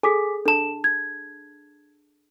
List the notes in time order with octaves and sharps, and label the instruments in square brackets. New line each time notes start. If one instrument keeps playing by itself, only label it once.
[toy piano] G#4 A4 [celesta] G#5 D6 B6
[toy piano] D4 A5 [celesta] A4 E7
[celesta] G#6